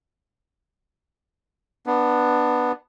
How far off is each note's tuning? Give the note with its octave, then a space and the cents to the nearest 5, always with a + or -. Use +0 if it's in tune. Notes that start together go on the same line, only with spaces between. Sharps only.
B3 -5 D4 +15